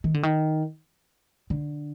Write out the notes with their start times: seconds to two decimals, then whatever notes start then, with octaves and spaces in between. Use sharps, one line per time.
0.04 D#3
0.14 D3
0.23 D#3
1.50 D3